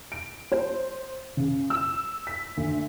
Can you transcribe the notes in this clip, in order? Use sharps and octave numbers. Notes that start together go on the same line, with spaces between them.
D7
C5
C#3
E6
B6
D2